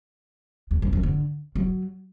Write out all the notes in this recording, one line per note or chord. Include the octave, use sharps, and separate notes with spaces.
E2
F#2
F#2
D3
F#3